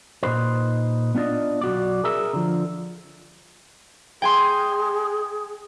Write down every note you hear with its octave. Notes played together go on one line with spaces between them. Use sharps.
A#2 D#4 B4 C5
B3 D4 F4 D5 D#5
B1 F#4 D5
G#4 A#4 E5
D3 F3
G#4 G5 G#5 C6